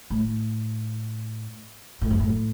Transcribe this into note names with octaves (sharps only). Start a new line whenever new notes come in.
A2
A2
F#2
A2